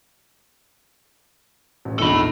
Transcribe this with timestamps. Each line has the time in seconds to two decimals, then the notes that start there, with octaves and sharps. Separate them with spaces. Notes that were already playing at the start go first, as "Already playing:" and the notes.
1.85 A1
1.99 A#1 E2 D#4 A4 B5